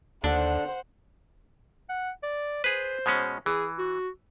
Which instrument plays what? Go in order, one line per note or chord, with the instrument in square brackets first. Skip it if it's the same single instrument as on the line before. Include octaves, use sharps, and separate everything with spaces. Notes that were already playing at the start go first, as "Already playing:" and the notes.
[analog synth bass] D#2 [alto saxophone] D3 [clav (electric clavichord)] D4 [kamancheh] C5 F#5
[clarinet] F#5
D5
[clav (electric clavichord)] G#4 B4 [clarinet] C5
[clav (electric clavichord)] B2 G#3 C#4
[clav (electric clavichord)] E3 [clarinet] G#4
[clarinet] F#4